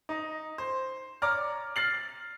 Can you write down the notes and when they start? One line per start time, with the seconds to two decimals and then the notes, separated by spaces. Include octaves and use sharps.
0.09 D#4
0.58 C5
1.22 C#5 D5 A#5 D6 F6
1.76 F6 A6 C7 F#7